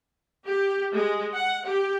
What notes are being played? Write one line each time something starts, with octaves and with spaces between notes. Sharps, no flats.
G4
G#3
F#5
G4